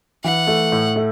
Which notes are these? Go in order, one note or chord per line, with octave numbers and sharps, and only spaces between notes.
E3 F#5
A3
A2
A3